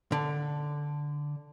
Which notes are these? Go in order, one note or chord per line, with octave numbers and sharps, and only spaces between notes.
D3